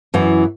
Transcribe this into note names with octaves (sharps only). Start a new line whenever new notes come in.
F#2 E3